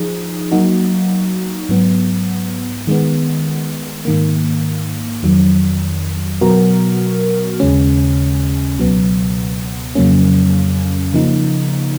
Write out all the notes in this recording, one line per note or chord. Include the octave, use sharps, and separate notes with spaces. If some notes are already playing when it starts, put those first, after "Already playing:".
Already playing: F3 D#4 G#4
F#3 A#3 D#4 F#4
G#2 F#3 B3
D#3 G#3 B3
G#2 D#3 A#3
F2 D#3 F#3
B2 F#3 B3 F#4 A#4
D#2 C#3 G#3 C#4
C#2 B2 F#3 B3
F2 C#3 F#3 A#3 C#4
C#3 F3 A#3 D#4